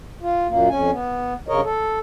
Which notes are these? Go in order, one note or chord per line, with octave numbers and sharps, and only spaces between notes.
F4
F#2 A#2 A#3
F2 C#4 G#5
B3
G2 C#3 A#4 C#5 D#5
A4